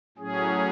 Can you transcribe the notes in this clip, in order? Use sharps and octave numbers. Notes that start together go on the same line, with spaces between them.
A2 F#3 C#4 G#4